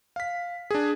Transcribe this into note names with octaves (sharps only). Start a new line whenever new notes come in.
F5 B6
D4 G#4